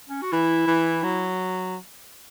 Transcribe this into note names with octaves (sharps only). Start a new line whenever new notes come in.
C#4
F#4
E3 E4
E3
F#3